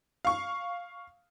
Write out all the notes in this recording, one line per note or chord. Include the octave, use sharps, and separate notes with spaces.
F5 C#6